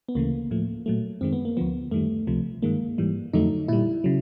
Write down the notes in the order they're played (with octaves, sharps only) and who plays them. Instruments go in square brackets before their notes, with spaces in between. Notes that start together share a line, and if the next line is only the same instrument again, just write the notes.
[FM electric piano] B3
D2 C#3 E3 A3 A#3
A2 F3 A3
A#2 F#3 A3
F#2 D#3 G#3 C4
B3
A#3
D2 D3 F3 B3
F#2 D#3 G3 A3
C#2 C3 F3 A3
G2 D#3 G#3 A#3
G#2 E3 G3
F2 D3 F#3 A3 D#4
A#2 G3 E4
C#3 F#3